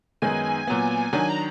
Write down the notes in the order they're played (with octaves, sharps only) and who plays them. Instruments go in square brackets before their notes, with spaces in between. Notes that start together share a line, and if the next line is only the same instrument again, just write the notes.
[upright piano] F#2 D#3 G#3 B3 D#4 [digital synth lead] G#5
[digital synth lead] G#5
[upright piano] A#2 F#3 B3
[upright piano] D#3 F#3 D4 [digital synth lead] G#5
[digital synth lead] A#5